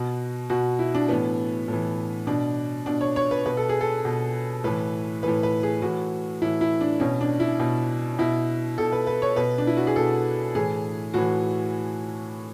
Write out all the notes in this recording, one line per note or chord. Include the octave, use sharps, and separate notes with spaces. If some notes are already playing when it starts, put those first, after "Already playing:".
Already playing: B2 F#4
B2 F#4
E4
D4
A2 E3 B3
A2 E3
B2 D4
B2 D4
C#5
C#5
B4
B2 B4
A4
G#4
A4
B2
A2 E3 B4
A2 E3 B4
B4
G#4
A2 E3 F#4
A2 E3 E4
E4
D4
B2 C#4
D4
E4
B2
B2 E4
B2 A4
B4
B4
C#5
B2 B4
D4
E4
F#4
G#4
B2 A4
A2 E3 G#4
A2 E3 F#4